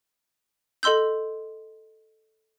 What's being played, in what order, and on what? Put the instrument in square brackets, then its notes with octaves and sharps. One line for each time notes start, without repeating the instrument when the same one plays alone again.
[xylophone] A4 D#5 C6 E6 G6